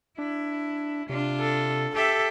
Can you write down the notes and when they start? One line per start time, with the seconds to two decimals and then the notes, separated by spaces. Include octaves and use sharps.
0.18 D4 E4
1.09 C3 D4 F4
1.40 A4
1.95 G4 A4 E5